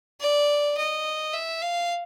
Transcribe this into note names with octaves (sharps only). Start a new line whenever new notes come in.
D5
D#5
E5
F5